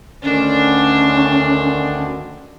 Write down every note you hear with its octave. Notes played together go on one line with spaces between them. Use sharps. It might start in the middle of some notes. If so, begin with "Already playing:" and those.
D2 D3 D#3 C#4 D4